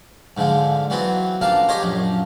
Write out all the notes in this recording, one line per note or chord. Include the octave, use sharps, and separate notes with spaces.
G#2 D3 F3 G#3
E3 F#3 B3 C4 F#4
A1 F3 D4 A#4 F5 A5
G4 C5 C#5 D#5 G#5 A#5
A#1 F#2 F3